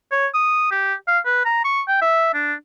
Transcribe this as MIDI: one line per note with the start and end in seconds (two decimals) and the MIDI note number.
0.12 0.27 73
0.34 0.69 87
0.71 0.94 67
1.08 1.19 77
1.26 1.42 71
1.45 1.62 82
1.65 1.81 85
1.88 2.00 79
2.01 2.32 76
2.34 2.54 62